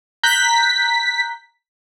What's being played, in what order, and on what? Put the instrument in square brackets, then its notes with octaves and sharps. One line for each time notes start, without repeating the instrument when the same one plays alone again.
[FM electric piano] A#5 F#6 G6 [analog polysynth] B6